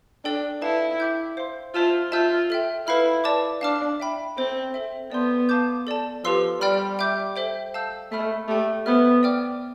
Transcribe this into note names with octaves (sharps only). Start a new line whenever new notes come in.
D4 A4 D5 G5
E4 B4 F5 A5
E5 G5 D6 G6
C5 F5 C6
F4 C5 E5 A5 E6
F4 E5 A5 E6 G6
A4 E5 G5
E4 B4 F5 B5 F6
B4 D5 A5 D6
D4 F5 A5 D6 F6
E5 G5 B5
C4 A4 C5 G5
A4 E5 G5
B3 D5 A5 C6 G6
F5 A5 D6 G6
A4 D5 A5
F3 G4 B4 F5 C6 E6
G3 D5 G5 B5 F6
E5 G5 D6 G6
A4 C5 E5 G5
F5 A5 E6 G6
A3 E5 B5 F6
A3 G4 D5 G5
B3 C5 E5 B5 F6
D5 G5 D6 F6